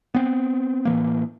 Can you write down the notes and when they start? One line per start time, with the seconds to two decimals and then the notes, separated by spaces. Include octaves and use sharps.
0.15 B3 C4
0.85 A2 E3 A#3